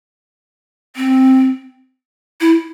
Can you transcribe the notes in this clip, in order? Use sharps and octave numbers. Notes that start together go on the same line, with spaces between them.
C4
E4